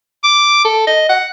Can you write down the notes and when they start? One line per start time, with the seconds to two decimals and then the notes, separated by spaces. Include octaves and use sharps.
0.24 D6
0.65 A4
0.87 D#5
1.09 F#5